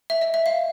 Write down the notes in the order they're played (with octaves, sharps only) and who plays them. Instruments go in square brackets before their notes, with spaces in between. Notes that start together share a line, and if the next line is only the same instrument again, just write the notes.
[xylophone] E5
D#5
E5
F5